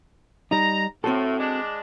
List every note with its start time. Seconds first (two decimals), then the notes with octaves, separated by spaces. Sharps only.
0.51 G3 D#4 A#5
1.04 A2 C4 F#4 A4
1.39 G#3 D4